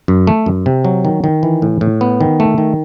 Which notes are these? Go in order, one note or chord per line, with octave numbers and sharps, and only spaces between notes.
F#2
A3
F#2
C3
F#3
D#3
D#3
E3
A2
A2
B3
D#3
A3
D#3